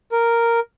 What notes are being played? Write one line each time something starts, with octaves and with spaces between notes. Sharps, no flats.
A#4